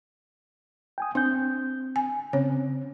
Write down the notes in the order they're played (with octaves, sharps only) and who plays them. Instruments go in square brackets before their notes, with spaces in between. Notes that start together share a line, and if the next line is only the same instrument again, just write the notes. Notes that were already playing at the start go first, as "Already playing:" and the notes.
[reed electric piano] G5 G#5 D#6
[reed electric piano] C4 G6 [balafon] D4
[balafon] G#5
[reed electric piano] C#3 C4 C#4 [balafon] C#5